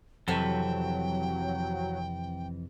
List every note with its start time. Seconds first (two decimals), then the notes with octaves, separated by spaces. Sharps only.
0.28 F2 C3 E3 F#3 A4 G5